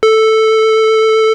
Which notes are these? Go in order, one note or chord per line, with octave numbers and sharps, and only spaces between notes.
A4